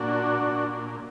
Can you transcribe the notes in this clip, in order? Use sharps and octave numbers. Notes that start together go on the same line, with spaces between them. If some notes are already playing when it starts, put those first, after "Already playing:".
Already playing: A#2 D4 F#4
A#2